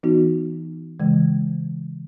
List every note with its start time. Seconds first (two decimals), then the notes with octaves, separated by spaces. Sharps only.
0.03 E3 B3 D#4 F#4
1.00 C#3 E3 G#3